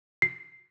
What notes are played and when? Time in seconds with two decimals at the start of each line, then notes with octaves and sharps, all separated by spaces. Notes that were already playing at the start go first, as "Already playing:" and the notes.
0.22 C7